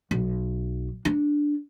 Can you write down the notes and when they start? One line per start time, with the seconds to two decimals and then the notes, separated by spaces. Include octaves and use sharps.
0.11 B1
1.05 D4